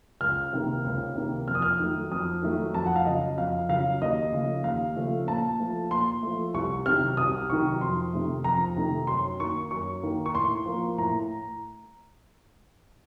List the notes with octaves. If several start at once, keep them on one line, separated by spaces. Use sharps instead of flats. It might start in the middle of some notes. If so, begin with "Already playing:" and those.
C#2 F6
C3 D#3 A#3
C#2
C3 D#3 A#3
F2 F6
D#6
F6
D#3 F#3 A3
F2 D#6
D#3 F#3 A3
F2 A5
F#5
F5
C#3 F#3 D#5
F2 F5
C#3 F#3 F5
D#2 D#5
C#3 F3 A3
D#2 F5
C#3 F3 A3
A#2 A5
F3 A3
A#2 C6
F3 A3
C2 C#6
C3 D#3 F#3 F6
C2 D#6
C3 D#3 F#3 C#6
F2 C6
C3 D#3 A3
F2 A#5
C3 D#3 A3
F#2 C6
D#3 A#3 C#6
F#2 C#6
D#3 A#3
C#6
A2 C6
F3 A#3
A2 A#5